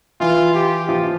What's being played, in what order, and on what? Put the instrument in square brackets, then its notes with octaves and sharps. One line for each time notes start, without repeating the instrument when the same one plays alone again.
[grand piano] E3 E4 [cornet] F4
[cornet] G4
[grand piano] F3 F4